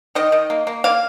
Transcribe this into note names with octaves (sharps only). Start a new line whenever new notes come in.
D#3 D#5
D#3
A#3
A#3
A#3 F5